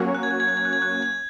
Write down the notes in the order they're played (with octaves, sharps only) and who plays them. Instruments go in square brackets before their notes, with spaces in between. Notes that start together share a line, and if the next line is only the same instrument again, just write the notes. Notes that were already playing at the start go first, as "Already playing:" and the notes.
Already playing: [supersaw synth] F#3 A#3 C#4 F#4 C#5
[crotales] F#6
G#6
F#6
G#6
F#6
G#6
F#6
G#6
F#6
G#6